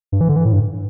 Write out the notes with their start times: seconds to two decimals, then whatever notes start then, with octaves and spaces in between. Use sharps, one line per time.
0.12 G2
0.21 E3
0.29 D3
0.36 E3
0.45 A2
0.52 G2